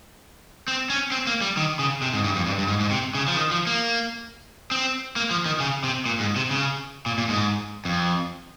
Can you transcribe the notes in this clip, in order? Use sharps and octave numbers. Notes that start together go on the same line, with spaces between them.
C4
C#4
C4
A#3
G3
D#3
C#3
C3
G#2
G2
F2
G2
G2
G#2
G#2
C3
C#3
F3
D#3
F3
A#3
C4
A#3
F3
D#3
C#3
C3
A#2
G#2
C3
C#3
A#2
A#2
G#2
F2